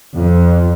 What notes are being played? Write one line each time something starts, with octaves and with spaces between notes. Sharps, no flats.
F2